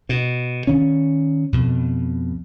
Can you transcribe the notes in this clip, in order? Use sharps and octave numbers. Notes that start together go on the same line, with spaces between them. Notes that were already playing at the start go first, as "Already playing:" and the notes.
B2
D#3 C#4
F2 B2